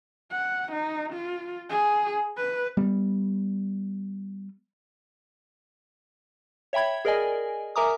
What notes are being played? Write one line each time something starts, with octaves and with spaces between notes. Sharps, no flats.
F#5
D#4
F4
G#4
B4
G3 B3
C#5 E5 G5 B5 G#6
G#4 A#4 D5 D#5 G#5
A#4 E5 G#5 A#5 D6 D#6